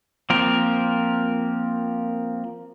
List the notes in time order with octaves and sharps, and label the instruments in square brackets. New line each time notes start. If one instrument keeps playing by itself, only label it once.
[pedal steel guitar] F3 A#3 C4 A#4